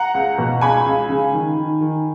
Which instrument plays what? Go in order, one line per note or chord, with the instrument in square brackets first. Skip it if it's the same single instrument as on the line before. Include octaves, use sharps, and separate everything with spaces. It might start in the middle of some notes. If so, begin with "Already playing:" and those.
Already playing: [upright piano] F#5 A#5
C#2
B2
C#2 G#5 B5
C#2
C#3
D#3
D#3
D#3